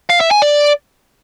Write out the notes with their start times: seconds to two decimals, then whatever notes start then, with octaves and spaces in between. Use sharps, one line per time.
0.10 F5
0.21 E5
0.31 G#5
0.42 D5